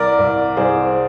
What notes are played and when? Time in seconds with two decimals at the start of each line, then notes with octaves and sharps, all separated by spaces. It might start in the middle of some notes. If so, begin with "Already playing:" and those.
Already playing: C2 A#4 D5
0.19 C2
0.57 C2 G#4 C5